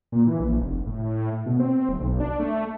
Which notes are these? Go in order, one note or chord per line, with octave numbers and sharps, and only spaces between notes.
A#2
E3
A#1
F1
A2
B2
C4
D1
B1
D4
A3